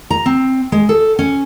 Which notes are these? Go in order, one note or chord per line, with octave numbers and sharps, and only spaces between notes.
A#5
C4
G#3
A4
C#4